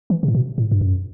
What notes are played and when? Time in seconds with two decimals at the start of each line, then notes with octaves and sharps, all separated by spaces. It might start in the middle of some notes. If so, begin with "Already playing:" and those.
0.10 E3
0.23 C3
0.28 A2
0.35 B2
0.58 A2
0.71 G2
0.81 F#2